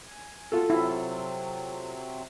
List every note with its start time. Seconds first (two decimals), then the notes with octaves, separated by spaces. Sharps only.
0.06 G#5
0.52 F4 F#4 A4
0.70 C3 F#3 C4 E4